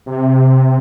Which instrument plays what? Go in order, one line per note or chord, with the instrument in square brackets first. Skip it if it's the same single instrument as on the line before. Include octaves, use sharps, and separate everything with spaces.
[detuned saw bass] C3